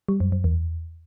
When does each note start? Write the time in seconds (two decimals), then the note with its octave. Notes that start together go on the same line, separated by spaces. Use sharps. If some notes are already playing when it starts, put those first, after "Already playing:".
0.09 G3
0.20 F#2
0.32 F#2
0.44 E2